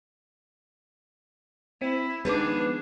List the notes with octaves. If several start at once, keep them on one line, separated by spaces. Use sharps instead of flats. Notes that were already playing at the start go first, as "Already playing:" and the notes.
C4 E4
D#3 F3 G#3 B3 D4 G#4 B4 D6